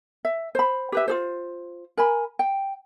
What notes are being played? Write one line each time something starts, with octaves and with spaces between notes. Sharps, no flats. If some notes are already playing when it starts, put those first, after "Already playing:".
E5
C5 B5
G4 B4 E5
F4 G#4 C5
A#4 G#5 B5
G5